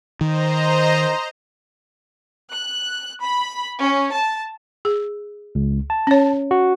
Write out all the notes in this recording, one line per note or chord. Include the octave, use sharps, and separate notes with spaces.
D#3 C5 D#5 A#5
F#6
B5
C#4
A5
G#4
C#2
A5
C#4 C#5
F#4